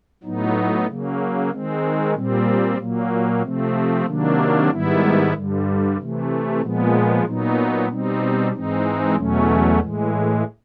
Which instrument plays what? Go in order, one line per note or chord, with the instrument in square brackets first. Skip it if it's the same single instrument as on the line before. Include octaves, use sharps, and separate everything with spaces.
[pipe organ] A2 F#3 B3 D#4
C#3 F#3 A#3
D#3 G#3 C4
A#2 G3 C4
A#2 F#3 A#3
C3 F3 A3 C4
C3 D#3 F#3 A#3 D4
G#2 D#3 G3 B3 E4
G2 D3 G3
C3 E3 A3
A#2 F3 G#3 B3
A#2 F#3 B3 D#4
B2 G3 C4 D#4
G#2 E3 G#3 C4 D#4
E2 B2 F#3 A3 C#4
A2 E3 G#3